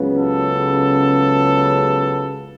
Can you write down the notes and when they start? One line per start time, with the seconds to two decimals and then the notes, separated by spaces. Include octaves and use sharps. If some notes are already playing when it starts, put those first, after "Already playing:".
Already playing: C#2 C#3 F#3 B3
0.14 A4